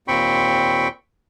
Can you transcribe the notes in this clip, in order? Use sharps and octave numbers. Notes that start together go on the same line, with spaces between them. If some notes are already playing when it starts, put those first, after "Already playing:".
D#2 A#2 C4 G5 B5 C#6